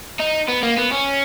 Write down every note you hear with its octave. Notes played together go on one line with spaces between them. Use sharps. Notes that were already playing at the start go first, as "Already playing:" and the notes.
D#4
B3
A#3
B3
C#4